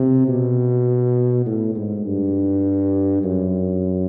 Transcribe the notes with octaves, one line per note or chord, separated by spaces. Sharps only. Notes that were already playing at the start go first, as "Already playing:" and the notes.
Already playing: C3
B2
A2
G#2
G2
F#2